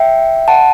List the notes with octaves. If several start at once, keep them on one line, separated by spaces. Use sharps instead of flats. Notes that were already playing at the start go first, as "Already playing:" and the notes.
Already playing: E5 G5
F#5 A5